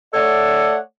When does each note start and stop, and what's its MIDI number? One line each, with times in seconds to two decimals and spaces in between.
0.14 0.78 57
0.14 0.78 69
0.14 0.78 73
0.14 0.78 74
0.14 0.78 78